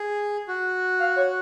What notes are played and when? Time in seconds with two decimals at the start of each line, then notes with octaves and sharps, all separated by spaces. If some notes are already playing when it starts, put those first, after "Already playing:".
Already playing: G#4
0.48 F#4
0.99 F5
1.16 C#5